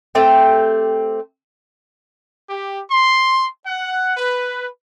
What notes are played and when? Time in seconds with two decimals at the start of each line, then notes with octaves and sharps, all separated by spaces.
0.15 A3 C4 G4
2.50 G4
2.91 C6
3.67 F#5
4.17 B4